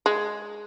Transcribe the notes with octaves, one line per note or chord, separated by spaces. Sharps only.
G#3